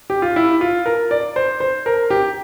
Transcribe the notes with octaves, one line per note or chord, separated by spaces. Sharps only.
G4
F4
E4
F4
A#4
D5
C5
C5
A#4
G4